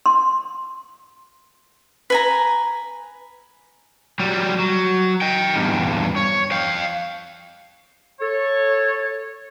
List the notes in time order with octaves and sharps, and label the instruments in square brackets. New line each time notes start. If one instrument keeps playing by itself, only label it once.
[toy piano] C6
[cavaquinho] B4 G#5 A#5
[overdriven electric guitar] F#3 G3
F#3
D#5 G5
E2 G2
C#5
F5 G5
[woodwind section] A4 C#5